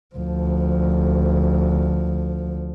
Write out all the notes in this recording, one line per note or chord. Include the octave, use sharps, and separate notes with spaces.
D2 F3